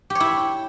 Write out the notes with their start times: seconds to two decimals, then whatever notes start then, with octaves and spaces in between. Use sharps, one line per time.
0.10 G4
0.15 C#5
0.20 E4